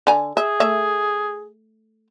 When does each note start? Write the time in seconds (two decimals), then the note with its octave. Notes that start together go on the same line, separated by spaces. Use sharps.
0.07 D3 G#5 A#5
0.37 G#4 E5
0.60 A3 E5